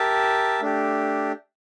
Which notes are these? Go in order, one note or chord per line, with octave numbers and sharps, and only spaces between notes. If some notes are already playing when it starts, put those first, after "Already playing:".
Already playing: G4 A#4 E5 A5
A3 D4 G4